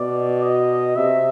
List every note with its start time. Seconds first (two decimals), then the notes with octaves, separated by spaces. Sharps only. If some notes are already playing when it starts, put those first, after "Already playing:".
Already playing: B2 D5
0.43 D#5
0.96 C3 E5